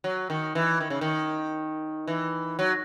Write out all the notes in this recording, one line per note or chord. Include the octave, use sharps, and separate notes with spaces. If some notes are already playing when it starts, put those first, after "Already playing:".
F#3
D#3
E3
D#3
C#3
D#3
E3
F#3